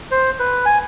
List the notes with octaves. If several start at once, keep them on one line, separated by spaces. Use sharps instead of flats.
C5
B4
G#5